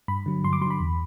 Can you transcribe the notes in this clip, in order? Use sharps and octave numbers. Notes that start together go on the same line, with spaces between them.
G2 B5
D3 F#3
G2 C6
D6
D3 F#3 B5 C6
E2